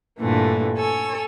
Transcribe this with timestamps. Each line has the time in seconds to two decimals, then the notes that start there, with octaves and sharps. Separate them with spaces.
0.21 G2 A#2 D3 E3 A3
0.78 A4 C#5 G#5 E6